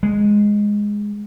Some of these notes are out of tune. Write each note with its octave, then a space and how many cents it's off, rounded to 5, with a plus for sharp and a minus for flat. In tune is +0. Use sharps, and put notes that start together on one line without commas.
G#3 -5